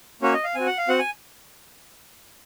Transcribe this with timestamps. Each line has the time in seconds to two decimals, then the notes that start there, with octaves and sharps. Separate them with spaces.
0.22 A#3 C#4 F#4 C#5
0.33 D#5
0.44 F5
0.55 C4 F#4 G#5
0.66 F#5
0.78 F5
0.88 C4 F#4 F#5
0.99 G#5